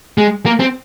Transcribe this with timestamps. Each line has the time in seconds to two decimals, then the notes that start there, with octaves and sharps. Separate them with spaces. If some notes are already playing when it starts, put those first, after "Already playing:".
0.18 G#3
0.46 A#3
0.60 C4